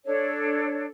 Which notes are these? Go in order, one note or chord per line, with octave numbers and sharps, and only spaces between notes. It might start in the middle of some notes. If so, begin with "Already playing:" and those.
D4 A4 C#5